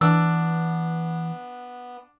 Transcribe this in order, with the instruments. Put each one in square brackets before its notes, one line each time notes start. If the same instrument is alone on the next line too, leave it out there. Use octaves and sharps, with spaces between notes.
[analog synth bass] E3 [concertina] B3 [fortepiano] D4 [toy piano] E6